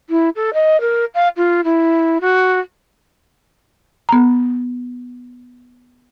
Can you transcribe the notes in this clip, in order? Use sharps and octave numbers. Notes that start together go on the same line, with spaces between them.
E4
A4
D#5
A#4
F5
F4
E4
F#4
B3 A#5